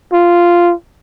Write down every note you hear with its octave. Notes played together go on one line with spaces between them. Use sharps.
F4